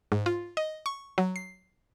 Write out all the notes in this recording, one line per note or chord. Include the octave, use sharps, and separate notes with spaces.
G#2
F4
D#5
C#6
F#3
C7